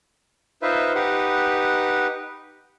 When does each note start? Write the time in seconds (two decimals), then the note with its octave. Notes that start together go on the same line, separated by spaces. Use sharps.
0.62 D#4 F4 B4 C5 E5
0.95 D#4 G4 B4 F#5